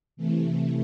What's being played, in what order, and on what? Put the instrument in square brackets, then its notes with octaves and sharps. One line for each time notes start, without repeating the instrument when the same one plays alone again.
[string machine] C3 E3 A3